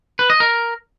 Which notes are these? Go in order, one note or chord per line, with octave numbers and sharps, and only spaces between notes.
B4
D#5
A#4